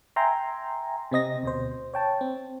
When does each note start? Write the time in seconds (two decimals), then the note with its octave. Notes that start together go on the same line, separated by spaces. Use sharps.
0.16 E5 G5 G#5 A#5 C6
1.11 C3 C4 D#5 A#6
1.43 D2 B2 C5
1.94 C#5 G5 A5
2.21 C4